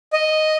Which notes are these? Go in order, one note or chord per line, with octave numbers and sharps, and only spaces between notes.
D#5